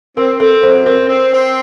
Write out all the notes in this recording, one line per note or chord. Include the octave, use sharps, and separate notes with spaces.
C4 A#4
C4 A4
F#2 C5
C4 A#4
C4
C4